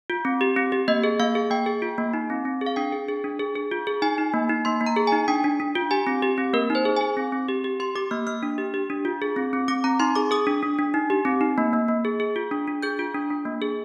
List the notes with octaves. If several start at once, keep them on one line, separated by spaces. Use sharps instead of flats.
F4
C4
G4
C4
G4
A#3 D#5
G#4
A#3 F5
G#4
A#3 G5
G#4
F4
A#3
D#4
C4
C4
G#4
F5
D4 G5
G#4
G#4
D4
G#4
G#4
F4
G#4
D#4 G#5
D#4
A#3
D#4
A#3 C6
A#3
A#5
G#4
G#5
D#4
D4 G5
D4
D4
F4
G4 G#5
C4
G4
C4
A#3 A#4
D#4 C5
G#4
G#4 G#5
C4
C4
G4
G4
G4 C6
G4 D6
A#3 F6
A#3 F6
D4
G4
G4
D4
F4
G#4
C4
C4
C4 D6
C4 A#5
D#4 C6
G#4 D6
G#4 D#6
D4
D4
D4
D#4
G4
C4
D#4
A#3
A#3
A#3
G#4
G#4
F4
D4
D4
G#4 G6
F4
D4
D4
A#3
G#4